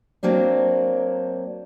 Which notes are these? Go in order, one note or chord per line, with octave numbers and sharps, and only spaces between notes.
F#3 A#3 C4 D4